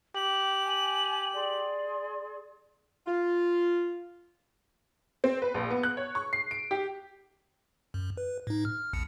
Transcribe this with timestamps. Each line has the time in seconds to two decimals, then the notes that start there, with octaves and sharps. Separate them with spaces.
0.15 G4 F#7
0.64 G#5
1.34 G#4 D5 C6
3.07 F4
5.24 C4
5.42 B4
5.54 A#1
5.71 B3
5.83 F#6
5.97 C#5
6.15 C#6
6.33 C7
6.51 D7
6.71 G4
7.94 F#2
8.17 B4
8.47 A2 D#4
8.65 F6
8.93 A#1 E2 C#7